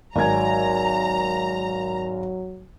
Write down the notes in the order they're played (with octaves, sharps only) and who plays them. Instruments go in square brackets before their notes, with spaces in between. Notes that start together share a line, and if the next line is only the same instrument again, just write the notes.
[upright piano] G#1 G#6 [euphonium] F#3 [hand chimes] D5 G#5 [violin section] A#5